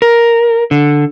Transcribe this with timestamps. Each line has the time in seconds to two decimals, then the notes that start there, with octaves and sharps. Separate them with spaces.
0.02 A#4
0.71 D3